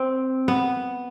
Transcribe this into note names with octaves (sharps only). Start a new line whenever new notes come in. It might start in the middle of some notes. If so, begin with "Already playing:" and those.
Already playing: C4
B3